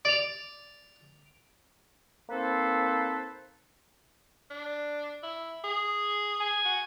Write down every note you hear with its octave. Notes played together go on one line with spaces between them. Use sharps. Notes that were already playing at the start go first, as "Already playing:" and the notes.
D5 D7 F7
A#3 C4 D#4 A4 B4 C5
D4
E4
G#4
G#5
F#4